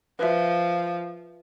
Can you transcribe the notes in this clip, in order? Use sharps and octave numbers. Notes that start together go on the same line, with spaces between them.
F3 B4 E5